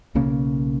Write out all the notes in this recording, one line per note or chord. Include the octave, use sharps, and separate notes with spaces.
B1 C#3 A#3 C#4